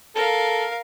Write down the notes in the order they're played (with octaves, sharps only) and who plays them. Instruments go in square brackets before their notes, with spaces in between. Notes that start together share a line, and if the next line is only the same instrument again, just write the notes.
[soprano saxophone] A4 [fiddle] A#4 F5